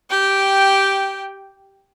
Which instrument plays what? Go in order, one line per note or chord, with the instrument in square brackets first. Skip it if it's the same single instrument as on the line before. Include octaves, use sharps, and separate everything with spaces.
[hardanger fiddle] G4 G5